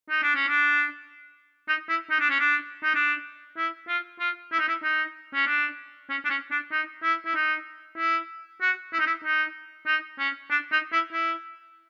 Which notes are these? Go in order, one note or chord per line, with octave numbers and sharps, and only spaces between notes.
D#4
D4
C#4
D4
D#4
E4
D#4
D4
C#4
D4
D#4
D4
E4
F4
F4
E4
D#4
E4
D#4
C#4
D4
C#4
D4
C#4
D4
D#4
E4
E4
D#4
E4
F#4
E4
D#4
E4
D#4
D#4
C#4
D4
D#4
E4
E4